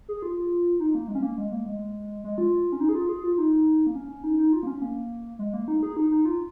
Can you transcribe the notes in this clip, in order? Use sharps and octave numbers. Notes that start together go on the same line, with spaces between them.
G#4
F4
D#4
A#3
G#3
C#4
A#3
G#3
A#3
G#3
G#3
F4
C#4
D#4
G#4
F4
G#4
F4
D#4
A#3
C#4
D#4
D#4
F4
A#3
C#4
A#3
G#3
A#3
D#4
G#4
D#4
D#4
F4